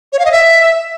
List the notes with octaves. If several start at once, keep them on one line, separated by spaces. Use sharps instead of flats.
C#5
F5
D#5
E5